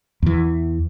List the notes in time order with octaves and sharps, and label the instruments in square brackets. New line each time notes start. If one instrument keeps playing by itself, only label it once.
[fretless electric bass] E2 E3